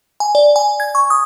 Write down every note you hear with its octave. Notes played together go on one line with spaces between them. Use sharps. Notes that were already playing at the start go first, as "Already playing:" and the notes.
G#5
D5
G#5
G#6
C#6
D#6